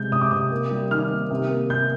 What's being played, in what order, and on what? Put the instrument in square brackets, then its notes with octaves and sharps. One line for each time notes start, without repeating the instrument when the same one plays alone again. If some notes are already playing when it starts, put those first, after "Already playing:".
Already playing: [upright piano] C3 G#3 G6
C3 D#6
D6
C3 D#6
A#3
G3
D#3 F6
A#3
C3
A#3
C3 G6